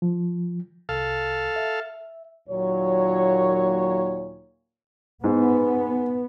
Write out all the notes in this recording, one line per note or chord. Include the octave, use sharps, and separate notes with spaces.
F3
C2 A4 F5
E5
D#2 A#2 F#3 C#5
G#2 B3